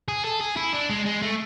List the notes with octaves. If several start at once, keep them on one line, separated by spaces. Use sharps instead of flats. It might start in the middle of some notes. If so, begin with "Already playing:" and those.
G#4
A4
G#4
E4
D4
G#3
G#3
A3